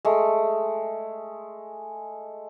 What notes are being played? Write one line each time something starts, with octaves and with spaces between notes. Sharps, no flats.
G#3 A3